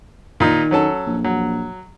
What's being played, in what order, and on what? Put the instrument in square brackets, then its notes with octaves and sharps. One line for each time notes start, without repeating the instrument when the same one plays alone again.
[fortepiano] A#2 D#4 [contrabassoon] D#3
[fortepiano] F#3 C#4 A4
[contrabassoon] A#1
[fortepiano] F#3